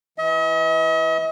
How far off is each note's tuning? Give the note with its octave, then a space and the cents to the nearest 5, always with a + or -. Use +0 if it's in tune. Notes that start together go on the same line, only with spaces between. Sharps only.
E3 +0 D#5 +45